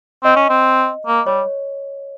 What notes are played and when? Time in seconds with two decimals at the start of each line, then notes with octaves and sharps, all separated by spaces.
0.24 C4 D#5
0.36 C#4
0.50 C4
1.07 A#3
1.26 G3 C#5